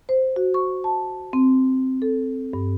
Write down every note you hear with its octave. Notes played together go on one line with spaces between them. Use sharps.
C5
F#4
C#6
A5
C4
A4
G2